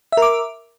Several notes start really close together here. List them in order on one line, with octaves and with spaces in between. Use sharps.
E5 A#4 D6